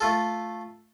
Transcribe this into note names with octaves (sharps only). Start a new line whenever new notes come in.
A3 F4 A4